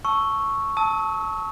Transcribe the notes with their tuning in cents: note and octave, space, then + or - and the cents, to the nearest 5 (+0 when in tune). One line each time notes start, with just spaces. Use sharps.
A5 +0 C#6 +0 E6 +0
A5 +0 E6 -45